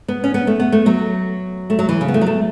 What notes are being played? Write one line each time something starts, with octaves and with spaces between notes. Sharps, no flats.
B3
C#4
B3
A3
B3
A3
F#3
A3
F#3
E3
C#3
B3
A3
F#3
A3